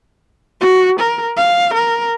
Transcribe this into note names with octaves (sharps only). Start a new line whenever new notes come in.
F#4
A#4
F5
A#4